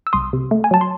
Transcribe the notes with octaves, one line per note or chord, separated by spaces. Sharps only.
E6
C2 C6 D#6
C3
A3
G#5
F#3 A5
C6